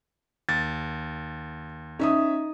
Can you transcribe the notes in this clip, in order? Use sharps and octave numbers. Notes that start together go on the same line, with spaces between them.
D#2 A6
C#4 D#4 E5 D#6